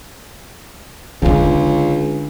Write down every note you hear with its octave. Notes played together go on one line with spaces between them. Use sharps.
C#2 D3 D4